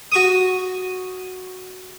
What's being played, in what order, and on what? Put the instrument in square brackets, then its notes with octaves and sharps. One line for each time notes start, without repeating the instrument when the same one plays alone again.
[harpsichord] F#4 C#6 D#6